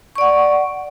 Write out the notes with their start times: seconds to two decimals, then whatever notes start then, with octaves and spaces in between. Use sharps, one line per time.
0.16 C#6
0.18 D5
0.21 F#5